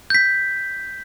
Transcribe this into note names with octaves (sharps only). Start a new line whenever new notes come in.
G6 B6